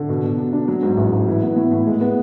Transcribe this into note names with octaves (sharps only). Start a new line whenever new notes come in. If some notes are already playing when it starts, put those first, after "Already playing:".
Already playing: D3
B2
B2
D4
D4
F#3
G#2
A1
A1
E3
B3
A2
A2
G#3
B3